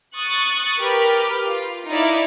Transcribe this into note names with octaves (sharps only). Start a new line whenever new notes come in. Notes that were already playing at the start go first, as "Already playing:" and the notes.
C#6 D#6 F#6 A6
G4 A#4 B4 F6
F4
D#4 E4 D5 F5